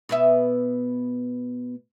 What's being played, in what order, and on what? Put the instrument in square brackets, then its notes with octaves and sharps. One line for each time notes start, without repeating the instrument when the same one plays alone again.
[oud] B2 B3 E5